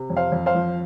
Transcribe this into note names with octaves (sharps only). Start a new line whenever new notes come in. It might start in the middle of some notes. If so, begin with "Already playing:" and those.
Already playing: C3
F2
C5 F5
F2
C5 F5
F3